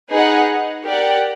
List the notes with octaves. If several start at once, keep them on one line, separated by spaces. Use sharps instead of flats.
D#4 G#4 B4 D#5 F#5
G4 A#4 D5 F#5